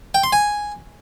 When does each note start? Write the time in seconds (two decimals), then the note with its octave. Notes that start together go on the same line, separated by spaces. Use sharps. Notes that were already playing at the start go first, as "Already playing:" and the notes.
0.15 G5
0.24 C6
0.33 G#5